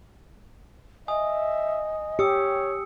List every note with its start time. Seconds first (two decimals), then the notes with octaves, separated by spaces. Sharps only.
1.08 D#5 E5 G#5 D#6
2.19 G4 C#5 D#6 E6 C#7